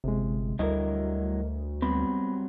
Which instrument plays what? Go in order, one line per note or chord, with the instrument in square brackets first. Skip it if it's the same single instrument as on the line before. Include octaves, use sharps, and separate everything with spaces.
[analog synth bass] G1 [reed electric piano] C3 G#3
[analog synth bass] D2 [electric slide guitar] F#3 G3 E4 [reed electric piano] A#4 D#5
[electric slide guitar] F#3 G3 C4 [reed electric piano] B3 B5